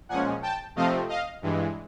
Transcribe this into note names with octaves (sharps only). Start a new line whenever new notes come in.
A#2 F3 G#3 C#4 F#5 G#5
G5 A5
C3 F3 A3 C4 D#5 F5
D#5 F5
G2 E3 G#3